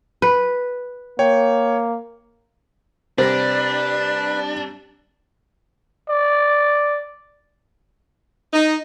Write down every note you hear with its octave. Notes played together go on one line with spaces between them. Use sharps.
B4
A#3 C#5 G5
C3 G3 D4 B4 C5 A#6
D5
D#4